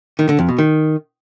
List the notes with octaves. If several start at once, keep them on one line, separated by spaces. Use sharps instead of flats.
D#3
D3
F2
B2
D#3